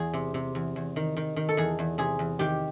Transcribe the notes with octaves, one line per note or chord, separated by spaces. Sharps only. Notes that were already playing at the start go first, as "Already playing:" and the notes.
Already playing: E2 G#4
C3
C3
E2
E2
D#3
D#3
D#3
A4
E2 G#4
E2
C3 G#4
E2
D#3 G4